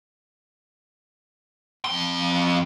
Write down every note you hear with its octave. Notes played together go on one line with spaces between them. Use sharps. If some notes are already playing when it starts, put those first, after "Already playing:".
F2 C6